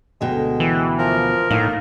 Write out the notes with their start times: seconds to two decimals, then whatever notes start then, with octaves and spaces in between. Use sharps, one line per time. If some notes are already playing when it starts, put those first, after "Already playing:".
0.21 D2 B2 G#3 G5
0.60 E3
0.99 F3 A#4
1.51 A2 A#3 D#4